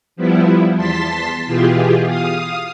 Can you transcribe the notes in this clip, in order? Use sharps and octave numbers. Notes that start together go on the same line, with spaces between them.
F3 G3 B3 E4
E2 A5 C6 A6 B6
B2 E3 F4 G4 G#4
F5 D#6